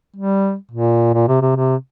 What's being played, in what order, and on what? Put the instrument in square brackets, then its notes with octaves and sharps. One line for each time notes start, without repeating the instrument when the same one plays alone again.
[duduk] G3
A#2
A#2
C3
C3
C3